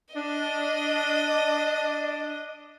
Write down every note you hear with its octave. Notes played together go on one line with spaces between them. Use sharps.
D4 D#5